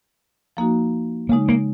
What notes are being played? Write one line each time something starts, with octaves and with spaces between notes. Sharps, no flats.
F3 A#3 D#4 F#4
C#3 G#3 A#3 D#4
A#3